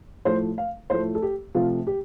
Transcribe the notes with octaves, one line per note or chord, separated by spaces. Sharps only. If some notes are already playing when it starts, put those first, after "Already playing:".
A2 F3 A3 C5
F5
A2 F3 A3 C5
A4
G4
C3 F3 A3 F4
G4